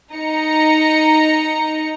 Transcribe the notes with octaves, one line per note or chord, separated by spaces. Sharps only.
D#4 A#5 C#7